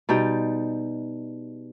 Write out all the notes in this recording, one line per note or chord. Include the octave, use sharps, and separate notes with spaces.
B2 G3 D#4 G5